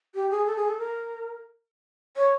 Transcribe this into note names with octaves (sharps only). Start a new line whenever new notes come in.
G4
G#4
A4
G#4
A4
A#4
C#5